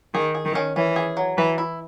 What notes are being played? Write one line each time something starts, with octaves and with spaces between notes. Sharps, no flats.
D#3 G#4
G#4
D#3
C#4
E3 C#4
G#4
F#3
E3 B4
E4